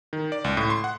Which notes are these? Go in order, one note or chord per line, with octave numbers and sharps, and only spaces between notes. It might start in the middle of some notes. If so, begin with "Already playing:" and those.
D#3
D5
C#2
A2
C6
F#5